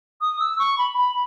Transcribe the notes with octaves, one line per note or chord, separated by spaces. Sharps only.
D#6
E6
C#6
B5
B5